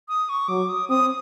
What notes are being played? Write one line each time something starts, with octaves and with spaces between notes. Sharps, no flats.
D#6
C#6
F#3 D6
D#6
C4 D#6